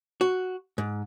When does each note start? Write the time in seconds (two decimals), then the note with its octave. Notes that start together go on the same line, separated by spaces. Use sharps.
0.21 F#4
0.78 G#2